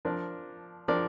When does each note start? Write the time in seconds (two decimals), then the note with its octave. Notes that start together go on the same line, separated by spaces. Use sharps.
0.05 F3 D4 A#4 D5
0.88 F3 D4 A#4 D5